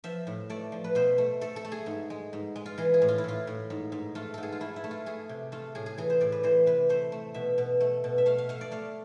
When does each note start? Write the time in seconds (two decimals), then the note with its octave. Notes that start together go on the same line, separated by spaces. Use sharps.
0.04 F3 E5
0.27 A2
0.50 A3 D5
0.72 F3
0.84 B4
0.95 B2 C5
1.18 A3
1.41 A3 A4
1.56 A4
1.65 A3
1.72 G#4
1.86 G#2
2.10 G#3
2.33 G#2
2.56 G#3
2.66 F4
2.78 E3 G#4
2.94 G#4
3.02 A2
3.08 F4
3.18 E4
3.24 A2 F4
3.47 A2
3.70 G#2
3.92 G#2
4.15 A3 F4
4.34 G#2 A4
4.43 G#4
4.52 F4
4.60 A3 E4
4.76 E4
4.84 A3
4.91 F4
5.06 A3 G#4
5.29 C3
5.52 A3 F4
5.75 A2 G#4
5.86 G#4
5.98 E3 G#4
6.10 C5
6.21 A2 D5
6.32 B4
6.43 E3 C5
6.66 C3 B4
6.89 A3 C5
7.12 A3
7.34 B2 E5
7.58 B2
7.80 A3
8.04 B2
8.18 E5
8.26 A3 F5
8.38 F5
8.49 A3 F5
8.61 D5
8.71 A3 F5